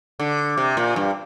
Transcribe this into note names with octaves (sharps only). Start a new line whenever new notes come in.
D3
C3
A#2
G2